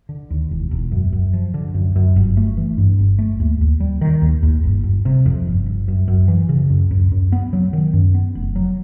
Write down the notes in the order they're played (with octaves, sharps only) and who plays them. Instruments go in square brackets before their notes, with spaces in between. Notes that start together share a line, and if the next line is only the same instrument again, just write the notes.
[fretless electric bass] D3
D#2
E1
E1
F#2
F#2
F3
D3
F#2
F#2
G1
A3
E3
G2
G1
A3
D#2
D#2
G3
D#3
D#2
D#2
G1
G1
C3
F2
G1
G1
F#2
F#2
E3
C#3
F#2
F#2
F#2
B3
F#3
D#3
F#2
B3
F1
F#3